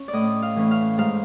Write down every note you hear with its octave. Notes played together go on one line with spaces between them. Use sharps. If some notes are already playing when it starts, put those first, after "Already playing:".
Already playing: C#4
D5
A2 D#5
F5
E3 A3 C#4
F5
G#2 F5